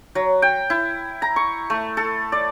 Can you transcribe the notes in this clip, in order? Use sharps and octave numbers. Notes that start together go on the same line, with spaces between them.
F#3
G5
E4
A#5
C#6
A3
A4
D5